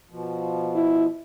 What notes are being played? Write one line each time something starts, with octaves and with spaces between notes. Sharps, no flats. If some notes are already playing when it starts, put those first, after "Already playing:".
B2 F3
E4